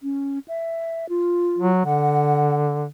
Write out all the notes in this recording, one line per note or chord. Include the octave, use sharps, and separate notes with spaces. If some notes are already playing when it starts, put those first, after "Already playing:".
C#4
E5
F4
F#3
D3 F#5